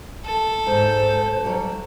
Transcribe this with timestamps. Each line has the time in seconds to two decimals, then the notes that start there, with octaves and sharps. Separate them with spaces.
0.25 A4
0.66 G#2 C5
1.44 F#3 G3